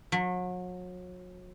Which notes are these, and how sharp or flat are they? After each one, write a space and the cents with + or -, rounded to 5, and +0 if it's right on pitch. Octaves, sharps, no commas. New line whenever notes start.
F#3 -35